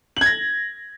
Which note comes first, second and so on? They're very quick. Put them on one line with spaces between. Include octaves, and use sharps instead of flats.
F#7 G#6 A#6